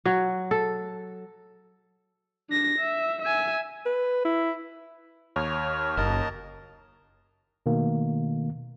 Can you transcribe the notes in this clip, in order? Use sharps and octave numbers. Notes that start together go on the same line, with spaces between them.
F#3
A4
D4 A#6
E5
E5 G#5
B4
E4
D#2 C#5 F6
F#1 A#4 D#5 A5
B2 D#3 A3 A#3